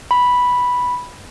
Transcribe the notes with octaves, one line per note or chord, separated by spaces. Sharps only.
B5